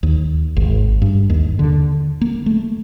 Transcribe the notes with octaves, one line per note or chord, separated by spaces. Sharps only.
D#2
G#1
G2
D#2
D3
A#3
A3